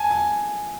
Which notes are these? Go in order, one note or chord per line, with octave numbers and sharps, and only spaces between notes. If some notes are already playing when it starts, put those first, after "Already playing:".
Already playing: G#5 A5
G#5